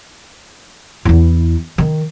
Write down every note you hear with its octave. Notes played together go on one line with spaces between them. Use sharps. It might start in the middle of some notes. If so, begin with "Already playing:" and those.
E2 E4
D#3